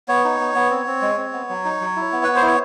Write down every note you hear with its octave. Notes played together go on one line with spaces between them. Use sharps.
B3 C#5
D#4
B3
B3
C4
C4
G#3
C4
B3
F#3
D#4
F#3
E4
B3
B3 B4
C5
E4
C#5